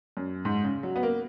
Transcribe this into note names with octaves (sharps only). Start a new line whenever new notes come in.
F#2
G#2
C#3
F#3
B3
A#3